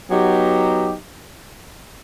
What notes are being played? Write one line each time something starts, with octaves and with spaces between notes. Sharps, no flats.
F#3 B3 D#4 G4